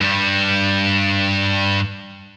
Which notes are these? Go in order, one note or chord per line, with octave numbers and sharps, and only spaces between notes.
G2 G3